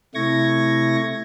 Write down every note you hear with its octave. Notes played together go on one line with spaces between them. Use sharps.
C3 A3 E4 C#6 G#6 A#6